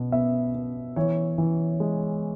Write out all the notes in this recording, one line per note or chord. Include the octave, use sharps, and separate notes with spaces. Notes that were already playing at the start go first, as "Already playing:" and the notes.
Already playing: B2 B3
B3 E5
B3
E3 C#5
E3
G#3